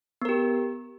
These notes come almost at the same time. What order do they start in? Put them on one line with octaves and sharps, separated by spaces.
B3 A#4 G4